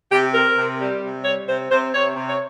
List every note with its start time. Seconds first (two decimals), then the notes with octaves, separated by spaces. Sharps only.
0.10 C3 G4
0.34 C4 A#4
0.56 C3
0.79 G3
1.02 C3
1.24 G3 C#5
1.47 C3 C5
1.70 C3 C5
1.93 C3 C#5
2.16 C3
2.28 C#5